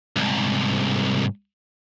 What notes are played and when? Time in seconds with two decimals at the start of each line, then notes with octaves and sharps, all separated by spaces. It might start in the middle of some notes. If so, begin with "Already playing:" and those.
0.16 C2 G#2